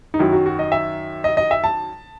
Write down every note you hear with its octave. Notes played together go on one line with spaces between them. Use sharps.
D#4
F#2 D#3 F#3 E4
F#4
F#4
D#5
E5
D#5
D#5
E5
A5